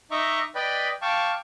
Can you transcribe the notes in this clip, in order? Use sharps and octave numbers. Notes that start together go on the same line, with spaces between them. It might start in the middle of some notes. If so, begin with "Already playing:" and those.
D#4 D#5 E5 A#5 C#6 D6
B4 D5 D#5 G5 B5
F5 G5 A5 C#6 D6